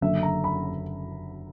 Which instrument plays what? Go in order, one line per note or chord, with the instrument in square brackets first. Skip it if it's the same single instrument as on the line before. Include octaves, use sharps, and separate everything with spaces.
[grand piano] F#1 F#2 D3 E5
A#5
B5